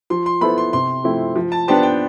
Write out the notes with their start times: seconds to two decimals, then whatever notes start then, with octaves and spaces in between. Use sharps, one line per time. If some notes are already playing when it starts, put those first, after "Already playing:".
0.10 F3 C6
0.26 C6
0.41 B3 E4 A4 C5 B5
0.58 C6
0.73 C3 C6
1.04 F3 A3 C4 E4
1.36 F3
1.52 A5
1.68 B3 D4 G4 C5 A5
1.83 G5